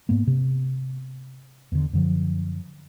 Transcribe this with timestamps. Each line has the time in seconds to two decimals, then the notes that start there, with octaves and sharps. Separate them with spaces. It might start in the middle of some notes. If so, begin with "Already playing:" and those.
0.09 G#2 A#3 B3
0.27 C3
1.72 E2 D3
1.93 F#2 D3 F3